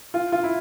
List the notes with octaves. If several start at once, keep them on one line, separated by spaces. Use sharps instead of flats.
F4
F4
E4